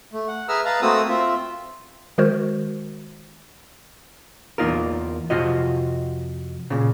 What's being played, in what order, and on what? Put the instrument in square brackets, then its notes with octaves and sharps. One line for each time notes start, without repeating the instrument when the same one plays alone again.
[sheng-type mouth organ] A3
F#5
G#4 B4 E5 A#5 E6 F6
B4 D#5 F5 A5 A#5
A3 A#3 C4 F#4 D#6 E6
C4 F4 E5
[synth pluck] D#3 G#3 F#4 A#4 C5
[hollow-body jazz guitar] E2 B2 A#3 D#4 F4 A#4
F2 C3 F4 F#4 D#5
A#2 C#3